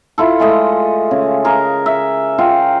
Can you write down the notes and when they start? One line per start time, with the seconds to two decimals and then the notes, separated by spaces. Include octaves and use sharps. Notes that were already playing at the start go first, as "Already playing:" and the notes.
0.18 E4 F4 A4
0.40 G#3 A3 A4 D#5
1.11 C#3
1.44 G#4 A#4 C#6
1.86 E5
2.38 F4 F5 G5